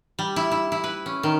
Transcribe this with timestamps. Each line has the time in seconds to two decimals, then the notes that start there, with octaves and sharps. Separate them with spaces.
0.19 G3
0.36 E4
0.52 E4
0.72 E4
0.84 B4
1.06 C#4
1.23 D#3